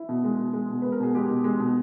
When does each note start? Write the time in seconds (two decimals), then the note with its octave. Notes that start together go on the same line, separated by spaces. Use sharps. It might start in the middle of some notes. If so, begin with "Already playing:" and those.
Already playing: E4
0.09 B2
0.24 G#3
0.39 B2
0.53 G#3
0.69 B2
0.82 G#3 B4
0.92 A#4
1.00 B2 G#4
1.15 G#3 G4
1.30 B2
1.44 G#3
1.60 B2